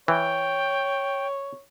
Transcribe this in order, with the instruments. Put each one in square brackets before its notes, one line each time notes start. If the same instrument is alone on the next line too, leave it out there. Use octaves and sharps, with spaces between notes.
[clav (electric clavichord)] E3 [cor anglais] C#5 [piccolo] G5